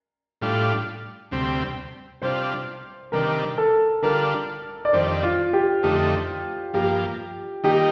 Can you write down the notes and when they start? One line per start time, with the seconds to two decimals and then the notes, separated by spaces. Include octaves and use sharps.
0.41 A2 G3 D4 F4
1.31 D2 C3 G3 C4
2.22 C3 G3 D4 F4 C5
3.12 C3 D#3 G3 D4 A#4
3.58 A4
4.03 D3 G3 D4 F4 A#4
4.85 D5
4.93 F2 D#3 G3 D4 C5
5.23 F4
5.53 G4
5.83 F2 D3 A3 D#4 G4
6.74 G2 F3 A#3 G4
7.63 D#3 G3 A#3 D#4 G4